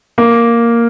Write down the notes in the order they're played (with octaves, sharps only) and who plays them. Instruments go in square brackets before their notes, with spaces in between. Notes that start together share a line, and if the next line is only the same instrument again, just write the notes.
[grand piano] A#3